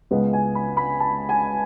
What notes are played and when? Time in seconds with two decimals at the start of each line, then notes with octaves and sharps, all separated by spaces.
0.11 C#2 C#3 G#3 B3
0.33 G#5
0.55 B5
0.77 B5
1.00 A5
1.29 G#5